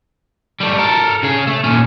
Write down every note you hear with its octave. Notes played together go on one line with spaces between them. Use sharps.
G3 A3
A4 A#4
C#3 G#4
A3
A#2 C#4